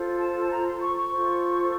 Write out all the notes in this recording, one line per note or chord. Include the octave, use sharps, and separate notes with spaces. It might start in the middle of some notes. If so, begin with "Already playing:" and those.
Already playing: F4 A4 C5
A5
A#5
C6
C#6
C#6
F4 A4 C5